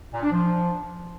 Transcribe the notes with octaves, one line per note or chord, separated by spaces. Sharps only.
A#2
D4
F3